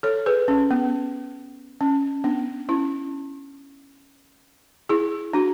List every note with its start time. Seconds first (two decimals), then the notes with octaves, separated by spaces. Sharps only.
0.03 A4 C#5
0.26 G#4 B4
0.48 C#4
0.71 B3
1.81 C#4
2.24 B3 D4
2.69 C#4 E4
4.89 E4 G#4
5.33 D4 F#4